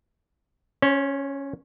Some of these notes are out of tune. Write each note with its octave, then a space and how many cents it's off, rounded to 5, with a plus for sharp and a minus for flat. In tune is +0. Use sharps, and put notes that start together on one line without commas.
C#4 +0 C5 +40